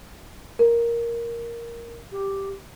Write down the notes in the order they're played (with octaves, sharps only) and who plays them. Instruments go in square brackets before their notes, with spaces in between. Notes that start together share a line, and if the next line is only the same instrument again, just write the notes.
[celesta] A#4
[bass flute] G4